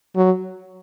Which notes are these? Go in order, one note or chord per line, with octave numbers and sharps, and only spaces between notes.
F#3